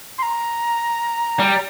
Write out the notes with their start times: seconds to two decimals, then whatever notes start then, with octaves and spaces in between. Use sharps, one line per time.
0.18 C6
0.23 A#5
1.39 G3